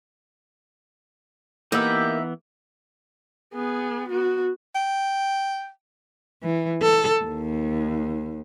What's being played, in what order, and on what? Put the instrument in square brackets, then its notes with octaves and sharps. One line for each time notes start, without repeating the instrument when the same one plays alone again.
[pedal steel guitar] E3 B3 [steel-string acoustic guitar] A#3 [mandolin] D#4 E5 [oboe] G4
[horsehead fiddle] B3 G#4
B3 F#4
[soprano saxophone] G5
[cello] E3
A4
D#2